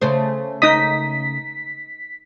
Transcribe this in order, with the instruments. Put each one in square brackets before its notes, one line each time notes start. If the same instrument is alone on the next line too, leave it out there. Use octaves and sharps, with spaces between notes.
[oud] C#3 A3 C5
[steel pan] D#4 D#5 D#6 [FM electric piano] B6